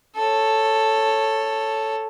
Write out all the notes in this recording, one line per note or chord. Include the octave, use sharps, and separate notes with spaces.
A4 C#5